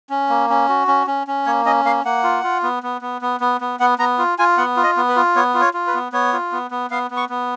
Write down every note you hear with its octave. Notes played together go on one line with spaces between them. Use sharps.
C#4
A#3
C#4
F#4
C#4
C#4
C#4
A#3 C#5
C#4 D#5
A#3 F5
A#3 F#5
F4
F4
B3
B3
B3
B3
B3
B3
B3 F#5
B3 A#5
F4
F4 G#5
B3 F#5
F4
D#5
B3
B4
F4
B3 C#5
F4
C#5
F4
B4
B3
B3 C#5
F4
B3
B3
B3 F5
B3
C#6
B3